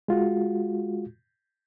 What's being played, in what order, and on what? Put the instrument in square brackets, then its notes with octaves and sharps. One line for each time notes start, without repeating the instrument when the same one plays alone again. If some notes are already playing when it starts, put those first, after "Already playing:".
[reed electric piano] G#3 F4 F#4